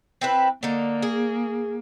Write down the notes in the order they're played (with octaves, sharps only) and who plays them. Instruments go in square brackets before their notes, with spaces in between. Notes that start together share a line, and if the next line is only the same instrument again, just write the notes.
[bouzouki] C4 E4 B4
[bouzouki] D3 D#4 [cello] A#3
[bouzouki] G#4